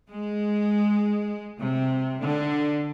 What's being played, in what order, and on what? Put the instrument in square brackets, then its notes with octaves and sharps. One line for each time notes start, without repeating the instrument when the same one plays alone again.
[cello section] G#3
C3
D3